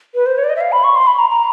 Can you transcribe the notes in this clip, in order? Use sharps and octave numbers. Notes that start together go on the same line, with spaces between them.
B4
C5
C#5
D5
D#5
E5
F5
B5
C#6
C6
B5
A#5
A#5